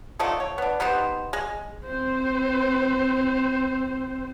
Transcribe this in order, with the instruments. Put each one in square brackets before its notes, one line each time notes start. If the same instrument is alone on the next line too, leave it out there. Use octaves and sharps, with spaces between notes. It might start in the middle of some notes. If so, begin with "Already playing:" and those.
[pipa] D3 F3 A3 D#4
C#5
B3 D4
B3 D#4 G4 C5
G#3
[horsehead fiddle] C4 C5